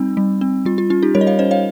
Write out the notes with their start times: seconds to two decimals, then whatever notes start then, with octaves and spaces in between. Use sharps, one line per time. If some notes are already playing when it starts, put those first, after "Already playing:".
Already playing: G3 C4 D#4
0.17 G3
0.41 C4
0.65 G3 F4
0.78 F4
0.90 C#4 F4
1.03 D#4 G4
1.15 G3 A#4 C#5
1.21 D#5
1.27 C#5 F5
1.39 C#4 C5 D#5
1.51 C#5 F5